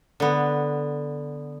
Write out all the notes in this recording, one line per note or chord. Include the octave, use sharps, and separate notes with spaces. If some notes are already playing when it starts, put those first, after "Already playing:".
D3 B3